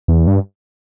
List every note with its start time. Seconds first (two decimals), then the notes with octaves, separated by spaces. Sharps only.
0.08 E2
0.27 G2